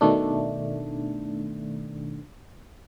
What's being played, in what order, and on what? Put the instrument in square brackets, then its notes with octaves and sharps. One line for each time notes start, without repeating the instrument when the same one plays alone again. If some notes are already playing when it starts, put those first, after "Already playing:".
[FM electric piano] B2 D#3 A3 D4